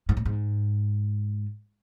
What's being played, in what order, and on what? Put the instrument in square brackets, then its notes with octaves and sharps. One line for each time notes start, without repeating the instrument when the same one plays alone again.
[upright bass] G#2
A2
G#2